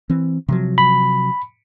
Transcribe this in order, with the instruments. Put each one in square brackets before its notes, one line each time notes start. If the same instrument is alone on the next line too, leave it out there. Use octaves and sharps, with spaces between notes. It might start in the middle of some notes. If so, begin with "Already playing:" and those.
[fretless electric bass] E3 C4
C3 F3 F#3
[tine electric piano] B5